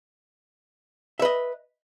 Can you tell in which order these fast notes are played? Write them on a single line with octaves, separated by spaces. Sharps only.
E5 B4 D#5